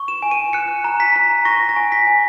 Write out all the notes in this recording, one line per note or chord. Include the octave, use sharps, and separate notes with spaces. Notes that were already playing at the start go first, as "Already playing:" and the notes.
Already playing: C#6
E7
G#5
D#7
F#6 C#7
A#5
B6
A#5
C#6 A#6
A#6
G#5
B6
G#5